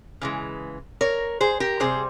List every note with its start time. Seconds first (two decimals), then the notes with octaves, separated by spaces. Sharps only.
0.21 C#3 E3 G#3
1.01 A#4 C#5
1.41 G#4 C5
1.60 G4 A#4
1.80 C3 G3 G#4 C5